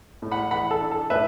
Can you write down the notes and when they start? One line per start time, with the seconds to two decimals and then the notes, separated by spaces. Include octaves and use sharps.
0.22 A2
0.31 F#5 B5
0.51 E3 F#5 B5
0.71 A4
0.82 D4
0.91 A4
1.10 A2 B4 E5